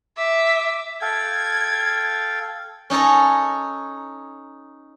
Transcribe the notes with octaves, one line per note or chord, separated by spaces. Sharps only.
E5 D6
A4 F5 G5 G#6
C#4 D#4 A4 C#5 A#5